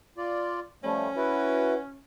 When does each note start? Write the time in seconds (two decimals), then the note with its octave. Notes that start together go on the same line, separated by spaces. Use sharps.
0.17 F4 D5
0.84 F3 G3 A3 C#4
1.16 E4 F#4 B4